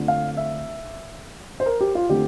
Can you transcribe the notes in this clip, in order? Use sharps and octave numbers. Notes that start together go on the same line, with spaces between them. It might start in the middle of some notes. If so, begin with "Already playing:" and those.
Already playing: D3 A3 C4 F4
F5
E5
C5
A#4
G4
F4
D3 A3 C4 G4